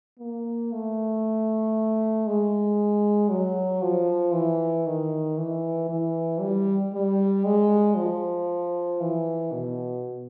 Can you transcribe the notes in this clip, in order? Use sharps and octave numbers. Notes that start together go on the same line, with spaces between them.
A#3
A3
G#3
F#3
F3
E3
D#3
E3
E3
G3
G3
G#3
F3
E3
B2